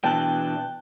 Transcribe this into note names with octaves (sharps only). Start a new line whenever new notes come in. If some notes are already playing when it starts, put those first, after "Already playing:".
B2 E3 D4 G5 A5 F#6